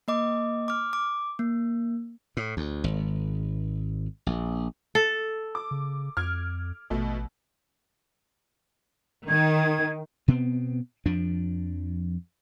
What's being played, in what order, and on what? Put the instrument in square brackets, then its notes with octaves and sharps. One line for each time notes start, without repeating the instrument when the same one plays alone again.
[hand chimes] A#3 D#5 D6
D6 F6
D6
A#3
[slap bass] A2
D2
G#1
A#1
[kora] A4
[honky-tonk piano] D6
[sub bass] C#3
[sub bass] F2 [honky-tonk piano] F6 G#6 D7
[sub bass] A1 [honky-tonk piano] B2 A3
[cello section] D#3 [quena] G#6
[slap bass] B2 B3 C4
F2 F3 D4